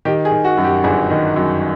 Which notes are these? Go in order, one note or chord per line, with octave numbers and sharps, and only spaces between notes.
D#3 G4
G#4
D#3
F#4
F#2
G4
G1 G#4
D#3
F#2